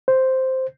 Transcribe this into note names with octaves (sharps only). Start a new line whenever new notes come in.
C5